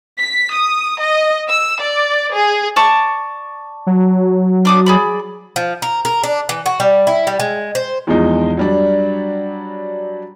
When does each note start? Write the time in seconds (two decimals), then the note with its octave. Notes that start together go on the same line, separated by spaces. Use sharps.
0.21 B6
0.54 D#6
1.03 D#5
1.50 E6
1.82 D5
2.34 G#4
2.76 D5 A5 C#6
3.87 F#3
4.65 D4 D6 D#6
4.86 G#4 D5 B5
5.56 F3
5.82 A#4
6.05 A#4
6.24 D4
6.49 E3
6.66 F#4
6.80 G3
7.07 E4
7.27 G3
7.40 G#3
7.75 C5
8.07 E2 F3 G#3 D#4
8.57 F#3 G3 D4